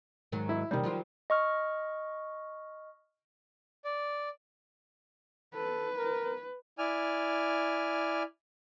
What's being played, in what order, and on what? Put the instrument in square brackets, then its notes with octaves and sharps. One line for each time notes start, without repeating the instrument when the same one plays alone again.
[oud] G#2 D#3 F#3
[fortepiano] E4
[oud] D#2 C3 [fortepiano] D#3 G3
[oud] F3 F#3 F4
[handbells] D#5 C#6 F6
[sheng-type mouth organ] D5
[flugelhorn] A4 [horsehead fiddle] B4
[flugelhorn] A#4
[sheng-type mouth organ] E4 D5 G#5 F6